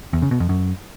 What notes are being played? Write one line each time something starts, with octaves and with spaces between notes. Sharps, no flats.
E2
C#3
B2
F2
F#2